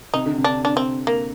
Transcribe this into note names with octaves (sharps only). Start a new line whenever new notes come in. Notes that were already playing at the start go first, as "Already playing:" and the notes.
C3 D#4
D3
C3
D4
D4
C4
A#3